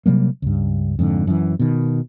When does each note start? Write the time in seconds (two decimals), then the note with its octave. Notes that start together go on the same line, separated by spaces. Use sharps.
0.06 C3 F#3 G3 A#3
0.42 C#2 G2
0.99 F2 G#2 D3
1.27 F#2 E3
1.59 B2 D#3